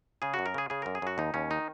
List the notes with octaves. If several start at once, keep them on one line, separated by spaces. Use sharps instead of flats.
C#3 G#4
F#4
F#2
A#4
C#3 G#4
C#3 G#4
F#2 A#4
G#4
F#2 F#4
D#2 D#4
D#2 C#4
D#3 D#4